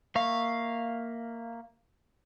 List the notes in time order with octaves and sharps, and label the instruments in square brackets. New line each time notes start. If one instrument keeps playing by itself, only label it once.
[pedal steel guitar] A#3 E5 C#6 [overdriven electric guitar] F5